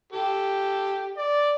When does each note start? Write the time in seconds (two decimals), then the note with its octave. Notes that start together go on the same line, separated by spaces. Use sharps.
0.13 G4 A4
1.17 D5